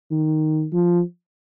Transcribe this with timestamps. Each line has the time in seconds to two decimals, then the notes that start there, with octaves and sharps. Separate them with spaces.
0.11 D#3
0.73 F3